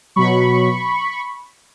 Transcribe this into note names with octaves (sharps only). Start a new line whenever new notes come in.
B2 F#3 B5 C#6